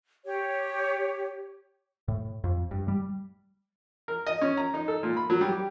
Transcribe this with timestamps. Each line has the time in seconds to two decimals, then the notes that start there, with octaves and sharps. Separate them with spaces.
0.25 G4 C#5
2.08 A2
2.44 F2
2.71 G2
2.88 G3
4.08 A#4
4.27 D#5
4.41 C#4
4.57 A#5
4.74 D#4
4.88 A4
5.03 A#2
5.17 B5
5.30 F#3
5.41 G3
5.52 G4